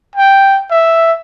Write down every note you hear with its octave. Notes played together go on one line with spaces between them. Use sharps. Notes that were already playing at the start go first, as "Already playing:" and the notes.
G5
E5